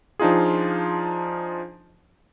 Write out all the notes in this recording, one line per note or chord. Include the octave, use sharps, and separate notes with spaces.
F3 D4 D#4 F4 G#4